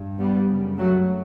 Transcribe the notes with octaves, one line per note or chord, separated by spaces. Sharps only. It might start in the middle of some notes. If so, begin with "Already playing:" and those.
Already playing: G2
G3 B3
F#2 C#3
F#3 A3